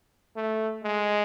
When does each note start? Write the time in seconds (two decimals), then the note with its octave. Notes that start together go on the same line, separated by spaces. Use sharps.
0.36 A3
0.84 G#3